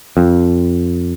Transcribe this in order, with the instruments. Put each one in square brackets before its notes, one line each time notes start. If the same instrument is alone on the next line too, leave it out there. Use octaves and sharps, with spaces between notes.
[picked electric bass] F2